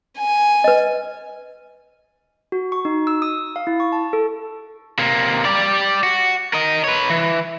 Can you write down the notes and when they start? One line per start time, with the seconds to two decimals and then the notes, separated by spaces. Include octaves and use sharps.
0.18 G#5
0.64 B4 D#5
2.52 F#4
2.72 C#6
2.85 D#4
3.07 E6
3.22 D#6
3.56 F5
3.67 E4
3.80 C#6
3.92 A5
4.13 A4
4.99 C3 A#3
5.45 G4 D5
6.03 F#4
6.53 A#4 D#5
6.84 B4 C#5
7.10 E3